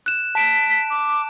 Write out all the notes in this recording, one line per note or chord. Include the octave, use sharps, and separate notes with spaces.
F#6 E7
A5 B6 D7 E7
D6